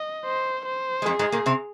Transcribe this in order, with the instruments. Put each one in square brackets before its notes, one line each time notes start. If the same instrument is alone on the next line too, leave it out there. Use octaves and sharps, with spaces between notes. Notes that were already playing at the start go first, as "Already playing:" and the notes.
Already playing: [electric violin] D#5
C5
C5
[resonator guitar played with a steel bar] G#3
[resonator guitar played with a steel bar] F2 F3 [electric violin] G#4
[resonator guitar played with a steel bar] G#2 G#3
A#2 A#3
C3 C4